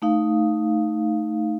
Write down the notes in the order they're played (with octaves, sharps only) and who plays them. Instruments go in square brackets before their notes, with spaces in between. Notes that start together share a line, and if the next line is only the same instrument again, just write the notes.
[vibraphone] A3 D#4 F5